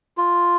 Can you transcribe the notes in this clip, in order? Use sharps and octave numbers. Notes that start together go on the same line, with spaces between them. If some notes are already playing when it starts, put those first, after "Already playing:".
F4